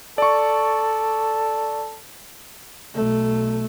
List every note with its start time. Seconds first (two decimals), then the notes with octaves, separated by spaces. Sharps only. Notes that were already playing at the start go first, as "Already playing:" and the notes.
0.18 A4 D5 C#6
2.94 B1 A3